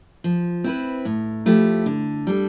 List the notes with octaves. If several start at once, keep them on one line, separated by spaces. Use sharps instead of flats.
F3
C4 E4 B4
A2
F3 A3 E4 G4
D3
G3 D4 A4